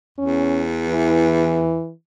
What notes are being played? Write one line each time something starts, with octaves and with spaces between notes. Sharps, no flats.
E2 C#4
E3